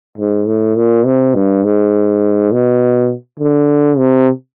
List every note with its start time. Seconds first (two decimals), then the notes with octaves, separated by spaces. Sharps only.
0.18 G#2
0.47 A2
0.76 A#2
1.06 C3
1.35 G2
1.64 G#2
2.52 B2
3.39 D3
3.98 C3